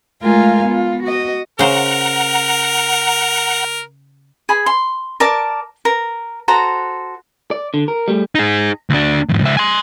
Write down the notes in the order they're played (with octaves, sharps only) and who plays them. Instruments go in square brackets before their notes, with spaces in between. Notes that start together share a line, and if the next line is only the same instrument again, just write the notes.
[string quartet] G#3 A3 F4 A#4 F5 G#5
B3 F4
F#4 D#5
[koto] C#3 C5 [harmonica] A#4 [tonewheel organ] F#5 A#5
[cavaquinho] G#4 B5
C6
A#4 D5 A5 D6
A#4
F#4 A4 C5 A#5
[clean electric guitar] D5
D3
A#4
G3 A3
[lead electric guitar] D#4 G#4
D2 D4
E2 G#2
C#2 E5
G#5 C6